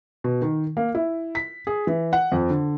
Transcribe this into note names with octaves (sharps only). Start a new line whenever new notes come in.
B2
D#3
A#3
E4
B6
G#4
E3
F#5
F2
D3